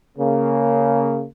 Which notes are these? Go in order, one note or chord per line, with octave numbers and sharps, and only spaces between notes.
C#3 A#3